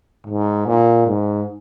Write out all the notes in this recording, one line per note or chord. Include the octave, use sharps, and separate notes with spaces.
G#2
A#2
G#2